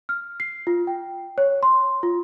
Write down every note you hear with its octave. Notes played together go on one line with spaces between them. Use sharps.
F6
C7
F4
G5
C#5
C6
F4